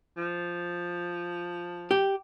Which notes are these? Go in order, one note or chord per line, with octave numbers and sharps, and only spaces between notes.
F3
G4